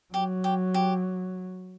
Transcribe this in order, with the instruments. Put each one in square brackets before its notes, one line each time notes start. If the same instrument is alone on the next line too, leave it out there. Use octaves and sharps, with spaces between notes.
[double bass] F#3 [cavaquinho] G4
[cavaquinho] G4
G4